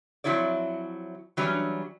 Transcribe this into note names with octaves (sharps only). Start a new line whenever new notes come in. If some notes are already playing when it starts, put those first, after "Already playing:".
F3 F#3 C4 E4 C#5 D5
E3 F#3 G3 C#4 D4